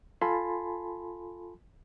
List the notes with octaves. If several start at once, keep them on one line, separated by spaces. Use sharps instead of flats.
F4 A4 G#5 A5 B5 C6